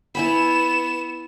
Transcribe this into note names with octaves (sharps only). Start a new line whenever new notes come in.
B3 E4 G#5 B5 E7